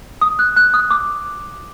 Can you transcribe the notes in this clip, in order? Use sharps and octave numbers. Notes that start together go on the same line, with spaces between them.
D#6
F#6
F#6
D#6
D6